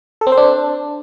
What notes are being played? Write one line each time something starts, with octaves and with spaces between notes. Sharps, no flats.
A4
C4
C5
D4